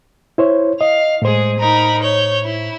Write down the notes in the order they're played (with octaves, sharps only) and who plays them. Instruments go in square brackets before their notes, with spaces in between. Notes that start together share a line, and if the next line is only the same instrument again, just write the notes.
[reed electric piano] E4 C5 C#5
[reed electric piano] D#5 [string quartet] F5
[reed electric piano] A2 C5 [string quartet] G#3 G#4
[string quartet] D#4 A#4 B5
C#5 G6
E4